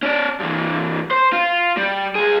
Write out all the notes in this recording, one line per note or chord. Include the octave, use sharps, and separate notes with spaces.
C#4 D5
G2 E3
C5
F4
G3
C#2 G#4